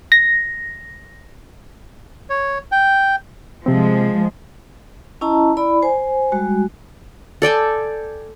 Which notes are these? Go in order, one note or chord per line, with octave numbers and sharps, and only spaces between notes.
A#6
C#5
G5
C3 F3 G#3 C4
C#4 E4 D#5 A5 A#5
E4 D5 B5
C5 G#5
G3 G#3 F#4
A4 D5 G5 G#5